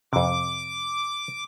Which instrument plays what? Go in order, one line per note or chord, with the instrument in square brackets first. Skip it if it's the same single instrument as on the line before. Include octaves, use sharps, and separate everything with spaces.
[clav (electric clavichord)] F2 C3 [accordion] D6